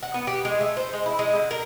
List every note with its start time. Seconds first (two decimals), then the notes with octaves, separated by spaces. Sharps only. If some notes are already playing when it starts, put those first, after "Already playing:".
0.03 F#5
0.14 B3
0.27 G4
0.45 G#3
0.61 A3
0.77 C5
0.93 G#3
1.06 E4
1.19 G#3
1.35 D3
1.51 A#4